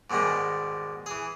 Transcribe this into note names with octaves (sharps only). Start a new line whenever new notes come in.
G#2 B2 D#3 G3 G#3
E3 G#4